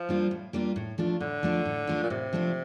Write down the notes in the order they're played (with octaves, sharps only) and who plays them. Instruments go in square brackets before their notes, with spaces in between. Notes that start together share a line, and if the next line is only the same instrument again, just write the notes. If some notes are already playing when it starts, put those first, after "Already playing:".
Already playing: [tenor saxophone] F3
[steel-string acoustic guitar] G3 A#3 D4 F4
A2
G3 A#3 D4 F4
A2
F3 A3 D4 F4
[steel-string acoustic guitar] A2 [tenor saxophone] D3
[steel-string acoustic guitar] F3 A3 D4 F4
A2
F3 A3 D4 F4
[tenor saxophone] A#2
[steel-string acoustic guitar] A2 [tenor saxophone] C3
[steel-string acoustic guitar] F3 A3 D4 F4